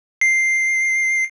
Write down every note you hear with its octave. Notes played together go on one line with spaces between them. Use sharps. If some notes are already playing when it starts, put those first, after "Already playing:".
C7